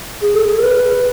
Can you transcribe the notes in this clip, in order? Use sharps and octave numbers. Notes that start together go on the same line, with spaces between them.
G#4
A4
G#4
A#4
B4